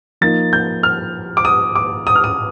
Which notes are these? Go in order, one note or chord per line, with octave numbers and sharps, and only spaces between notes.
F3 A#3 D#4 A6
G6
F6
D6
D#6
D6
D#6
F6
D#6